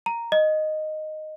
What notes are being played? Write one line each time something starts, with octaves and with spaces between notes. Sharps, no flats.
A#5
D#5